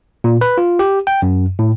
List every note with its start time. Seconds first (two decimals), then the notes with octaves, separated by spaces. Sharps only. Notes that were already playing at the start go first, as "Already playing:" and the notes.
0.24 A#2
0.41 B4
0.58 F4
0.79 G4
1.07 G5
1.22 F#2
1.59 A2